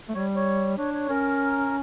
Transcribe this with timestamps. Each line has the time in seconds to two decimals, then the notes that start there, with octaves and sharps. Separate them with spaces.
0.09 A3
0.15 G3 C#5
0.36 C#5
0.78 D4 C#5
0.94 C#5
1.09 C#4 A#4